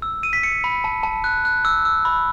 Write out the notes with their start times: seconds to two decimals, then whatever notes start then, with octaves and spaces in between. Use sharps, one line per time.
0.02 E6
0.23 E6 D#7
0.33 B6
0.43 E6 C#7
0.64 B5
0.84 A5
1.03 A5
1.24 F#6
1.45 F#6
1.65 E6
1.85 E6
2.05 B5